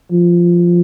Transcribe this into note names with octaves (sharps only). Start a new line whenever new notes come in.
F3